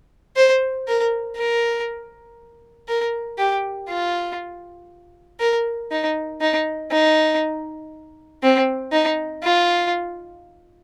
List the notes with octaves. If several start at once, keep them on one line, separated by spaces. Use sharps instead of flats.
C5
A#4
A#4
A#4
G4
F4
A#4
D#4
D#4
D#4
C4
D#4
F4